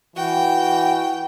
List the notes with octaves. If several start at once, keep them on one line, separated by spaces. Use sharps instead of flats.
E3 F#4 G5